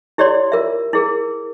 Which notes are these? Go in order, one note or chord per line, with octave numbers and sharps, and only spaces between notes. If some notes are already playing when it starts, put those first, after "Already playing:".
E4 G4 C#5 D5 C6
F4 A#4 E5
E4 G#4 A#4